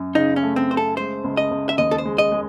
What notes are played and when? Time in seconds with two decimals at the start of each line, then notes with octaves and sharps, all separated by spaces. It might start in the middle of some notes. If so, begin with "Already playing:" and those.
Already playing: F#2
0.15 C#3 D#4
0.36 C#4
0.43 A3
0.56 C4
0.70 C#3 C5
0.77 A4
0.97 G#3 C5
1.24 C#2
1.37 D#5
1.51 C#2
1.69 E5
1.78 D#2 D#5
1.91 A4
1.98 C5
2.05 G#3
2.18 D#5
2.32 G#3